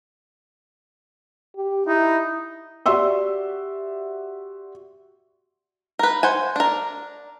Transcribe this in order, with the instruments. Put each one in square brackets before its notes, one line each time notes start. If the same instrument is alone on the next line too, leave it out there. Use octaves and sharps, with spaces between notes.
[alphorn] G4
[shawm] D#4 [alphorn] E4
[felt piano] F#4 G4 D5 E5 C6 E6
[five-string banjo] A#4 B4
C5 F#5 G#5
D4 A#4